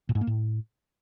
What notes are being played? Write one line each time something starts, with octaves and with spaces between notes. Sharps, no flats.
A#2
G#2
A#3
A2